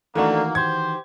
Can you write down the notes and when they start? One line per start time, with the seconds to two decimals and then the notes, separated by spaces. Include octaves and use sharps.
0.15 D#3 E3 A3 A#3 D4 F#4
0.55 G4 C5 G#6